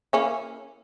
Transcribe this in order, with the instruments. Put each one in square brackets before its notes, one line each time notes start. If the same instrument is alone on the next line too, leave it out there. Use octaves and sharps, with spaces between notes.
[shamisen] A#3 C#4 E4